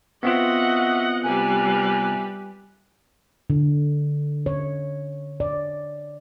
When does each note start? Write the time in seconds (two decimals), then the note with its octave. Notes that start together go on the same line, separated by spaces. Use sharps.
0.23 B3 C4 F4 F#4 D#5 E5 F#5
1.24 C3 G3 B4 G#5 F#6
3.50 D3
4.46 C#5
5.40 D5